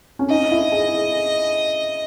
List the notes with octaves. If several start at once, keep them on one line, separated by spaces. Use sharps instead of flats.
C#4
D#4 D#5
E4
G#4